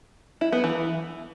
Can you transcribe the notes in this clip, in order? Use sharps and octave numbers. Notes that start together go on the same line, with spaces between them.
E4
B3
E3